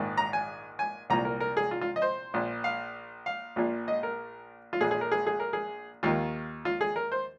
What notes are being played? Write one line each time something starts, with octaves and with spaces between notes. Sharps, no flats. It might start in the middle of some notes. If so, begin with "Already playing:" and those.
Already playing: A#1 G#2 D#3
A#5
G#5
G#5
C2 A#2 A#5
A#4
A#4
G#4
F4
F4
D#5
C5
A#1 A#2
F5
F5
A#1 A#2
D#5
A#4
F4
A#1 A#2 G#4
G#4
A#4
G#4
G#4
A#4
G#4
D#2 D#3 F4
F4
G#4
A#4
C5